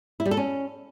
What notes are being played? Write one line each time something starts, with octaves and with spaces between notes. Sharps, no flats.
E4
G3
A4
C#4